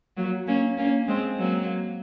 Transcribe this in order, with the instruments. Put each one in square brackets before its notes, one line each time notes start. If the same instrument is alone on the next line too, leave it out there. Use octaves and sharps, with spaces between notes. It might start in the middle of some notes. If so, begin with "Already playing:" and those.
[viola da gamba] F#3 A#3
A#3 C#4
A#3 C#4
G#3 C4
F#3 A#3